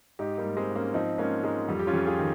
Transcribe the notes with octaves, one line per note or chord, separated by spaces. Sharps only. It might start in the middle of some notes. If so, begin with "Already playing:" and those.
G#2 D#4 G4
G3 A#3
G#2
G#3 C4
G#2
A#3 C#4
F3 C4 D#4
G#2 A#3 C#4
G#2 G#3
F2 G3
G4
C#4 F4
F2
F4 G#4
D#3